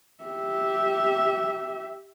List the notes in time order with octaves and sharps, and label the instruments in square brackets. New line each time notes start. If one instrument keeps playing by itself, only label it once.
[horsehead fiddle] G4 E5